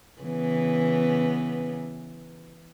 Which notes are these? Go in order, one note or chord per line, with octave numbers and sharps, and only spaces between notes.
C#3 E3 B3